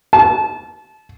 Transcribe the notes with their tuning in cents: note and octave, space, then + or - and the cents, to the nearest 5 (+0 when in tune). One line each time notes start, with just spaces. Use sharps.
A5 -25